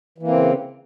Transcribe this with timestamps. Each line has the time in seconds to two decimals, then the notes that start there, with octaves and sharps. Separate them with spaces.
0.18 E3
0.23 A#3
0.28 C4
0.32 C#3